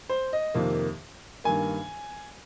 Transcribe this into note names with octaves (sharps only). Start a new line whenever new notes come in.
C5
D#5
F2 C3 D#3 A#3
G2 D#3 A#3 G#5